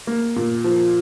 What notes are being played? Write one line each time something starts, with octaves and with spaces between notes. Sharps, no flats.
A#3
A#2
F3